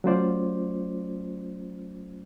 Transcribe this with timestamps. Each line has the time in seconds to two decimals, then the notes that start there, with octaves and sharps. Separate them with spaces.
0.04 F#3 A3 C#4 F4 C5 D5